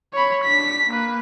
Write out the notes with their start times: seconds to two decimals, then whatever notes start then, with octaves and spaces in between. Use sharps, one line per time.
0.13 C#5 B5
0.45 D4 B6
0.89 A#3 B4